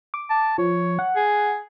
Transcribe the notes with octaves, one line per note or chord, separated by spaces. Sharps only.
D6
A5
F3 C#5
F#5
G#4